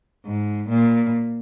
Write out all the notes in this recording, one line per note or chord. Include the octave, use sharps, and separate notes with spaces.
G#2
A#2